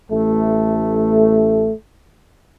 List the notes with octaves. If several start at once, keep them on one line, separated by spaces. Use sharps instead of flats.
A1 A3